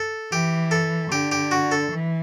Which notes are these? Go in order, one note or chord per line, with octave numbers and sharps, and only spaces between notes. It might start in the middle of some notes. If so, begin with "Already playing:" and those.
Already playing: A4
E3 G4
A4
D3 G4
G4
F#4
A4
E3